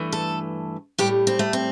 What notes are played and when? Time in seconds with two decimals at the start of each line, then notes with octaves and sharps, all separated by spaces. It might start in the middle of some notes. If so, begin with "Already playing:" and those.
Already playing: G2 E3 A3
0.12 A4
0.98 A2 G3 G4
1.27 C4
1.39 A3
1.53 C4